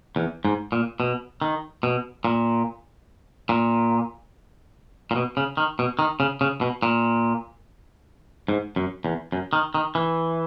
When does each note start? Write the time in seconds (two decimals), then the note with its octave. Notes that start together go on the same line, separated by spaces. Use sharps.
0.16 E2
0.45 G#2
0.72 A#2
1.00 B2
1.42 D#3
1.83 B2
2.25 A#2
3.49 A#2
5.11 A#2
5.16 B2
5.37 C#3
5.57 D#3
5.79 B2
5.99 D#3
6.20 C#3
6.41 C#3
6.61 B2
6.83 A#2
8.48 G#2
8.76 F#2
9.05 E2
9.32 F#2
9.53 D#3
9.74 D#3
9.95 E3